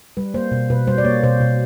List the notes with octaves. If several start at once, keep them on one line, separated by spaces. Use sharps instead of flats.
G3 B4
A#3 C5
B2
B2 B4
G3 C5
D5
A#3 C#5
B2 C5
B2